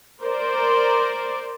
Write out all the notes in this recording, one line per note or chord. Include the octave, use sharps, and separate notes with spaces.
A#4 C5 D5